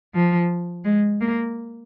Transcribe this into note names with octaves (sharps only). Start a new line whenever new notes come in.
F3
G#3
A#3